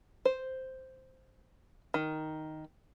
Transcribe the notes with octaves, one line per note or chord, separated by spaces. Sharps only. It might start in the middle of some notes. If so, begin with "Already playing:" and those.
C5
D#3